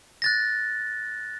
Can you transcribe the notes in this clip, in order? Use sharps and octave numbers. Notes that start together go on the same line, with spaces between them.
F#6 A6 A#6